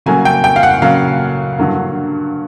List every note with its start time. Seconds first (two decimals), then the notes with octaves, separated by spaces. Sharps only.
0.06 C#3 F#3 A#3 G#5
0.25 G5
0.44 G5
0.56 F5
0.63 F#5
0.82 C#3 F#3 A#3 F5
1.58 G2 D3 F#3 A#3